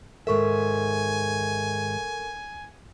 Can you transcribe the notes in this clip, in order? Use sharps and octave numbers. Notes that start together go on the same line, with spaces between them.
G#2 D#3 A4 A#4 E5 G#5 C#6